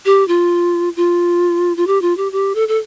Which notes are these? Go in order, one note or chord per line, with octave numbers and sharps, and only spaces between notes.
G4
F4
F4
F4
G4
F4
G4
G4
A4
A4